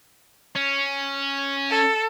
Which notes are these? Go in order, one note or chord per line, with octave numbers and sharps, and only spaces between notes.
C#4
A4